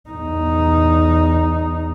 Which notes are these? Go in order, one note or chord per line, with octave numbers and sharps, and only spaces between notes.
E2 D#4